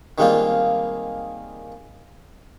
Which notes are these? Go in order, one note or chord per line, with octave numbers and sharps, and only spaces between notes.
D#3 G3 G#3 A#3 C4 F4